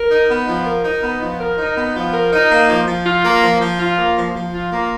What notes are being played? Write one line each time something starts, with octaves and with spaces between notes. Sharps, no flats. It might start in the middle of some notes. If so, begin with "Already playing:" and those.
Already playing: A#4
D#4
B3
F3
A#4
D#4
B3
F3
A#4
D#4
B3
F3
A#4
D#4
A#3
F3
F3
F4
A#3
F3
F3
F4
A#3
F3
F3
F4
A#3